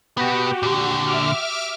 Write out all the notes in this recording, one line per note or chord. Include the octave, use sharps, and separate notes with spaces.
B2 B3 F#4 G4
A#2 D3
E5 D6 F6